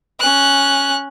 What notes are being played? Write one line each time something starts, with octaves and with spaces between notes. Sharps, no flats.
C#4 F#6